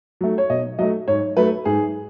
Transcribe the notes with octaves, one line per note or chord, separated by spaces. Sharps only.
F#3 A3
C#5
B2 D#5
F#3 A3 D#5
G#2 C#5
F#3 A3 B4
G#2 G#4